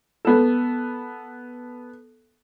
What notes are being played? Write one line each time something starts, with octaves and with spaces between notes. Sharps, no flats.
B3 A4